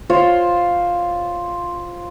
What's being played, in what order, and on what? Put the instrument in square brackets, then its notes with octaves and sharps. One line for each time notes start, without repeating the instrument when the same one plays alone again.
[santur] F4 C5 C#5